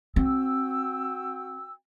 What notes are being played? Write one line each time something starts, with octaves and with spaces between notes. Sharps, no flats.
C4 F#4 G5 E6